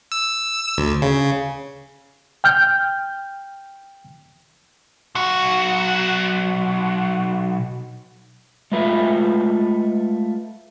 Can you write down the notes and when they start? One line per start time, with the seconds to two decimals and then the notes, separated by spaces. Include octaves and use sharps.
0.12 E6
0.78 D2
1.02 C#3
2.44 G5 F6 G6
5.15 B1 F#4
8.72 G#3 A3 F4 B4 E5